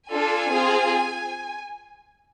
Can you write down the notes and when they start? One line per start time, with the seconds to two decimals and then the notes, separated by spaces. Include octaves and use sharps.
0.12 D4 F4 A4 G#5
0.52 C4 F4 G#4